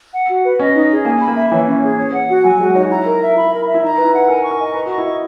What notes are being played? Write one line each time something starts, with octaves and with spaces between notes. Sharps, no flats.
F#5
F#4
B4
C#4 D#5
D#4
G#4
A#3 G#5
B5
A#3
E5
E3 C#5
C#4
G#4
C#5
F#5
F#4
F#3 G#5
G#3 F#4
D#4 C#5
F#4
E4 A#5
A#4
E5
E4 B5
A#4
E5
E4
D#4 A#5
B4
E4
F#5
A#4 G#5
C#6
A#4
D#5
B4 A#5
F#4
C#6
E4
D#5